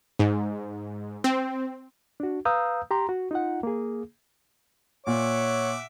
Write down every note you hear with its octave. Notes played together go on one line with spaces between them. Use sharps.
G#2
C4
D4 F#4
B4 F5 A#5 D#6 E6 G6
G4 A#5 C6
F#4
D#4 F4 F#5
A#3 G#4
A#2 C#5 E5 F#5 D6